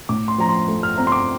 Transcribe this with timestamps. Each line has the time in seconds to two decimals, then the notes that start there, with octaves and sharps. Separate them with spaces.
0.09 A2 D6
0.28 C6
0.38 F3 A#5
0.49 C6
0.68 A3
0.83 F6
0.98 C4 A#5
1.07 C6
1.12 D6